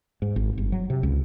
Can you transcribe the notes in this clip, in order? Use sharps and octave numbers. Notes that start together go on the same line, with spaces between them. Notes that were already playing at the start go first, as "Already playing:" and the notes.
G#2
G#1
G1
F#3
C3
C#2